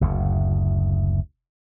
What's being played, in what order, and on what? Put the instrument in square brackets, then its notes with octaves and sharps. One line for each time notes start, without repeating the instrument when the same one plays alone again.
[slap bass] F#1 D2